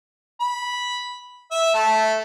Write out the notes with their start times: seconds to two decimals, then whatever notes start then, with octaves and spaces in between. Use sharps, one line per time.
0.41 B5
1.51 E5
1.74 A3 A5